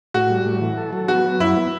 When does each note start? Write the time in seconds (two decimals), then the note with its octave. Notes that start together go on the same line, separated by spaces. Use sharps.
0.14 A2 F#4
0.30 G3
0.45 A2
0.61 E3
0.77 A4
0.93 F#3
1.08 B3 F#4
1.25 F#3
1.40 F#2 E4
1.57 B3